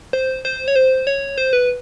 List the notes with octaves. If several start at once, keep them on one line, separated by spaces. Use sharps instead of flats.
C5
C5
C#5
C5
C#5
C5
B4